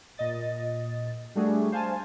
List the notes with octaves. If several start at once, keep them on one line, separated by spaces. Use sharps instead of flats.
A#2 D#5 A6
G3 A3 D4 F#4 G#4
C5 F5 G#5 A5